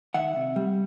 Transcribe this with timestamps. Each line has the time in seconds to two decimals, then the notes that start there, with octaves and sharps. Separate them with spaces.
0.14 D#3 E5 F#5
0.36 C3
0.56 G3